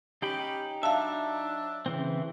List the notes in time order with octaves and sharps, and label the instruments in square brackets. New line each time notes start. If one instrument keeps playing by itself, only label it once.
[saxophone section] C#4 G4 [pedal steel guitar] D#4 G5 B5
[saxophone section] F#3 D4 [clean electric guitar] E5 [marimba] F5 A5
[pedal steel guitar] C#3 E3 C4